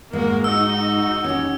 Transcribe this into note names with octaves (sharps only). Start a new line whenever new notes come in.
G#2 G#3 A#3 F#4 A#4
D#4 F#4 E6
C#4 G4